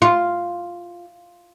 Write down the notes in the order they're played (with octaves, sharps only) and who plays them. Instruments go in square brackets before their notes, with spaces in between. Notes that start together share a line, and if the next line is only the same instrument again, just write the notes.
[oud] F4